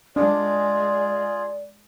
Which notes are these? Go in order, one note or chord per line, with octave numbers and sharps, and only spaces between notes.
G#3 D4 F4 G#4 D5